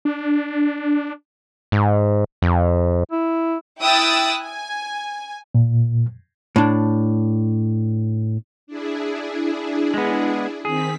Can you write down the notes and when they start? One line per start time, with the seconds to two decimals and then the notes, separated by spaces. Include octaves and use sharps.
0.05 D4
1.72 G#2
2.42 F2
3.12 E4
3.81 E4 G5 D#6 E6 F#6 A6
4.43 G#5
5.55 A#2
6.56 A2 D4
8.67 D4 E4 G#4
9.94 G#3 B3
10.65 D#3 C4 G#4 B6